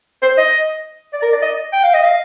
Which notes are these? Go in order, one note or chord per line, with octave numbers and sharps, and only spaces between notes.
C5
D#5
D5
A#4
D5
D#5
G5
F5
D#5
F5